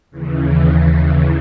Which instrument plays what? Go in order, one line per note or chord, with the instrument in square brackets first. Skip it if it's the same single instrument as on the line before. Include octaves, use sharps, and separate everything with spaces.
[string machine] D#2 C#3 E3